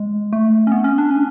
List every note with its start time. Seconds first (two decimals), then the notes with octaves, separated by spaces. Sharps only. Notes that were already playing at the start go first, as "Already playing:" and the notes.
Already playing: G#3
0.33 A3
0.67 C#4
0.72 B3
0.84 C#4
0.98 D4
1.11 C#4